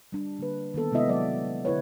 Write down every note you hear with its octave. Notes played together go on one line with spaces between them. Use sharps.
G3 D4
D3 A#3 B4
D#3 A#3 B3 A4
C3 G#3 B3 E4 D#5 E5
F#3 D5 D#5
D3 E4 B4 C#5